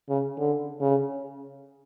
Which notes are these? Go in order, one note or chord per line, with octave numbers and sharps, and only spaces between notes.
C#3
D3
C#3